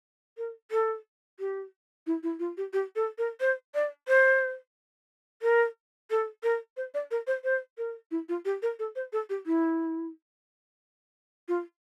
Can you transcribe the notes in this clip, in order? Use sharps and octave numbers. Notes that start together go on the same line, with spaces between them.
A#4
A4
G4
E4
E4
F4
G4
G4
A4
A#4
C5
D5
C5
A#4
A4
A#4
C5
D5
A#4
C5
C5
A#4
E4
F4
G4
A#4
A4
C5
A4
G4
E4
F4